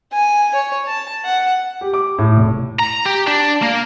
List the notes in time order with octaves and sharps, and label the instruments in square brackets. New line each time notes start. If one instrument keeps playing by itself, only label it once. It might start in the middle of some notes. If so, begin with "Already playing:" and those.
[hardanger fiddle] G#5
C#5
A5
F#5
[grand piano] G4
D6
A2
F1
[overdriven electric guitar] A#5
G4
D4
A#3